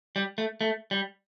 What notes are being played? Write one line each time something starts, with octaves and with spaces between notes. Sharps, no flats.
G3
A3
A3
G3